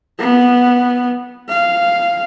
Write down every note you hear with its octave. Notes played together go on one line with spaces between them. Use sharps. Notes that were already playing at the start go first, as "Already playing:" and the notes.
B3
F5